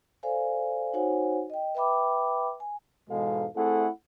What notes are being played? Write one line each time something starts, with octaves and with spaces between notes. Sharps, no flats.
A4 C5 D5 F5 G#5
D#4 F#4 C5 C#5 F#5 G#5
D#5 G5
B4 E5 G5 B5 D6
G#5
E2 G#2 B2 G#3 A4 F5
A3 C4 E4 G#4 A4 F#5